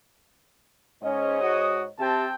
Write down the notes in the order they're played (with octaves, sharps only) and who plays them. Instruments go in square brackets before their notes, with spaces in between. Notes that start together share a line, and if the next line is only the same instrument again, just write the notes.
[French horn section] G#2 C#5 D#5 [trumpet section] C#4
[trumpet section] F#4 D#6
[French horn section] C3 G4 [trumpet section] C4 G5 A5